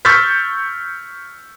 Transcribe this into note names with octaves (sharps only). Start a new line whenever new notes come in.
C#6 E6 F6 G6 A6 B6